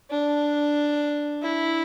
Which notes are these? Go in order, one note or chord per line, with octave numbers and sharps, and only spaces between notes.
D4
E4